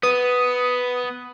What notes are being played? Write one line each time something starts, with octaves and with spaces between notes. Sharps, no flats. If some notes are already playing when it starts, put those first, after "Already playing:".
B3 B4 D#6